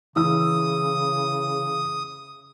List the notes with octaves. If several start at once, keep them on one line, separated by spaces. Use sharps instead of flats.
C#3 E3 D#6 E6